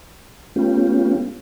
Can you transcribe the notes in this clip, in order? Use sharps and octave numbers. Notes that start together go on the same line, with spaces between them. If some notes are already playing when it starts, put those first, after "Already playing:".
A3 B3 C#4 F4 G4